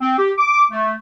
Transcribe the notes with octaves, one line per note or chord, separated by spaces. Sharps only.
C4
G4
D6
A3